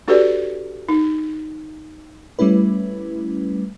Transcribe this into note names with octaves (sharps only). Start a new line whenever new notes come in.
D4 F#4 G4 A4 B4 D5
D#4
G3 A3 C#4 E4 B4